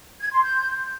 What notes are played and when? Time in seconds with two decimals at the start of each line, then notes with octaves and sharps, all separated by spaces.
0.20 G#6
0.32 C6
0.43 G6